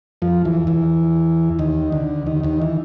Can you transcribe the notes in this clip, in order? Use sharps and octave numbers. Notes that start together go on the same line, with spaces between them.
F2 F3
E2 E3
E2 E3
D#2 D#3
D2 D3
D#2 D#3
D#2 D#3
E3